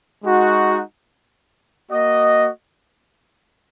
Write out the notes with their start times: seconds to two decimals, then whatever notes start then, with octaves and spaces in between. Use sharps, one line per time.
0.23 G#3 D#4 F#4
1.91 A#3 F#4 D#5